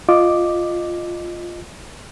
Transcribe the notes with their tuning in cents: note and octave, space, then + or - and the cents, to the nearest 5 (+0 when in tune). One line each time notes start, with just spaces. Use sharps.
F4 +0 D#5 -15 D6 +0